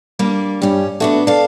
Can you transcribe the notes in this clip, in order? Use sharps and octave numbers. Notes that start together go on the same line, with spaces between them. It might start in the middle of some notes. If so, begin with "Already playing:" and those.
G3 A#3 D4
G2 G3 C#4
A3 B3 D4 F#4
D4 A4 F5